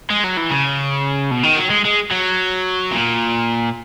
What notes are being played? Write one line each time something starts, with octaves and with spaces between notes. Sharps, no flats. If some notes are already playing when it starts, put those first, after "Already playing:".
G#3
F#3
E3
C#3
B2
D#3
F#3
G#3
G#3
F#3
A#2